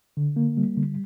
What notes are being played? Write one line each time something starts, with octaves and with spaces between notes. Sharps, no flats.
D3
A#3
G3
D3